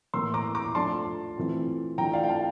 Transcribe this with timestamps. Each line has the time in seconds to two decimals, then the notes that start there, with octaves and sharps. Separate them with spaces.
0.14 A2 E3 A#3 C6 E6
0.34 A#5 D6
0.55 A#5 D6
0.75 F3 A3 D4 F4 A5 C6
1.37 E3 A3 C4 F4
1.98 E3 A3 D4 F4 G5 A#5
2.13 D5 F5
2.23 G5
2.29 F5 A5